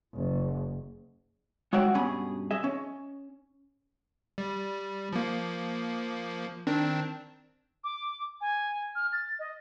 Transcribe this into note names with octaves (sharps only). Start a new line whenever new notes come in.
F#1
G#3 F#4 C#5 E5 F#5 G5
G2 B2 C#4 G#4 B5
G#4 D#5 E5
C#4
G3
F3 A#3
D#3 C4 D4
D6
G#5
F6
A6
D#5